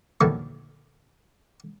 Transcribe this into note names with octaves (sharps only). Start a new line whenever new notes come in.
A#1 E2 D3 D#3 F#3 A3